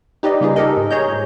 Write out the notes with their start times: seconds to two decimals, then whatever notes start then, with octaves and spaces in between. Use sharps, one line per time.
0.23 D#4 G4 B4 D5 D#5
0.41 C#3 G3 A#3 D#4 F4 G#4
0.56 D#4 G4 A4 A#4 D#5
0.77 G#2
0.91 G#4 C#5 D#5 A#5 G6
1.08 G#2